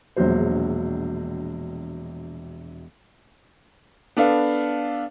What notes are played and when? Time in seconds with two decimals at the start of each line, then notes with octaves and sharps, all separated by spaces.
0.16 E1 A#1 E2 F#3 C5
4.17 B3 D4 A4 F5